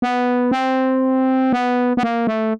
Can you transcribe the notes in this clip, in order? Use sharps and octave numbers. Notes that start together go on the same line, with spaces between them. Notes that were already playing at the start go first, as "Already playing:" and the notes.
B3
C4
B3
B3
A#3
A3